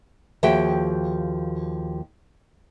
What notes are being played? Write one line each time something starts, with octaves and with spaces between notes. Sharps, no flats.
D#2 F3 F#4 G#4 E5 G5